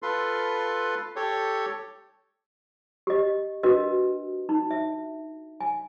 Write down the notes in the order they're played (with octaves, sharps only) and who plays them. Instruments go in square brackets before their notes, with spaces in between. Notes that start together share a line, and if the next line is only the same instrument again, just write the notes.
[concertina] F4 A4 B4 C6
G4 A4 C#5
[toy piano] G4 D#5
D4 F#4 A#4 B4 D#5
D#4
E5
G#5